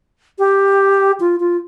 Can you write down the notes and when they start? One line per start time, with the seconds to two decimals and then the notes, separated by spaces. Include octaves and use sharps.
0.39 G4
1.20 F4
1.40 F4